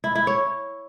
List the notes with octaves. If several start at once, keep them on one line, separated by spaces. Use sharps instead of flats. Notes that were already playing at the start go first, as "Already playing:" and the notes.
E4
E4
C#5